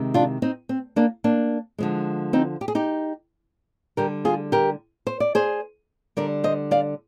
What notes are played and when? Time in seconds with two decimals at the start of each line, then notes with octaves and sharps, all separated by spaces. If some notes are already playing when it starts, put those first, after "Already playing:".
Already playing: C3 D#3 G#3
0.14 D4 F4
0.42 C4 D#4
0.69 C4
0.96 A#3 D4
1.24 A#3 D4
1.78 D3 F3 G#3
2.33 C4 D#4
2.61 G4
2.68 G#4
2.75 D#4 G4
3.97 D3 G3 G4 A#4
4.25 F4 G#4
4.52 G4 A#4
5.07 C5
5.20 D5
5.35 G#4 C5
6.17 D3 G3 A#4 D5
6.44 C5 D#5
6.71 D5 F5